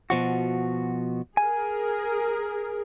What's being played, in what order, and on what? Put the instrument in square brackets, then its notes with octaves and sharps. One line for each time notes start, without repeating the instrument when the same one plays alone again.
[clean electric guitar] B2 F3 F#4
[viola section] G#4 A#4 [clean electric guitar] G#5